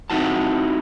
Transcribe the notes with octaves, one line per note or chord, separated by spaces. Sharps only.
C4 D#4 E4 F#4 A5